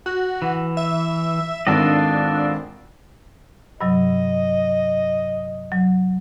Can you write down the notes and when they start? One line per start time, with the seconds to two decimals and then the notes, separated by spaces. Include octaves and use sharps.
0.06 F#4
0.42 E3
0.77 E5
1.67 G#1 D4 F4 A4 D#5
3.81 G2 C3 F#3 D#5
5.72 F#3